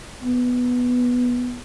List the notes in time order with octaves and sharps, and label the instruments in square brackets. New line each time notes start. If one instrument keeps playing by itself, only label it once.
[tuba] B3